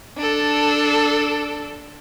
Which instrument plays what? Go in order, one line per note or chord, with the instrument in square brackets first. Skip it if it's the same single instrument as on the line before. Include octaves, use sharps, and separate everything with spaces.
[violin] D4 A4